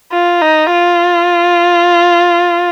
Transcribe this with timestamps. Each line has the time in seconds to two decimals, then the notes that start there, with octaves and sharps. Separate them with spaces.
0.12 F4
0.42 D#4
0.72 F4